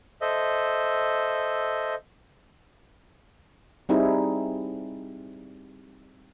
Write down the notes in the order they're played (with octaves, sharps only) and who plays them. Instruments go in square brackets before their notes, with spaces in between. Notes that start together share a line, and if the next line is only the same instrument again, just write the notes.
[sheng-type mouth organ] A4 C5 D#5 E5
[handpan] G3 C4 D#4 E4 G#4